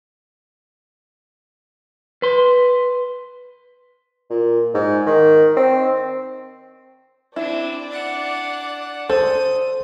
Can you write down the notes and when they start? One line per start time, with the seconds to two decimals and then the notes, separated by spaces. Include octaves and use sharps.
2.22 B4 C6
4.30 A#2
4.74 G#2
5.06 D#3
5.57 C4
7.36 C4 D4 E4 D5
7.89 D4 F#5
9.10 A4 C5 D#6